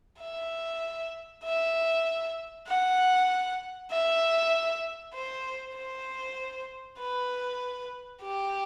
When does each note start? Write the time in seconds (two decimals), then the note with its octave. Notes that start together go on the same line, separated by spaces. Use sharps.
0.21 E5
1.44 E5
2.67 F#5
3.90 E5
5.13 C5
5.76 C5
6.98 B4
8.22 G4